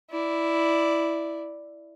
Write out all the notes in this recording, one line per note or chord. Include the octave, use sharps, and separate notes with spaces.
E4 D5